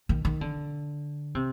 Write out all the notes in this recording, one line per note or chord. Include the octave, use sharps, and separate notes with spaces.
D#3
D#3
D3
C3